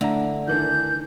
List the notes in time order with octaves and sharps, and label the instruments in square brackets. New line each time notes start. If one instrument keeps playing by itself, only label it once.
[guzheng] D3 [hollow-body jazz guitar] A3 A#5 [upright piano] E4
[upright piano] D#3 E3 D4 [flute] G6